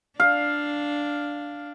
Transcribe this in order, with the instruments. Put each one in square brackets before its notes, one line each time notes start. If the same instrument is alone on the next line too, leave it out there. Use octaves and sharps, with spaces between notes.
[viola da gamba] D4 [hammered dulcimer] F5